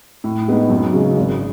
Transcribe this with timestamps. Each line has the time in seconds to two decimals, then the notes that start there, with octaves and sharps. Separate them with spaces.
0.24 A2
0.48 G#3 B3 D#4
0.70 F#2
0.93 C#3 G#3
1.17 G#1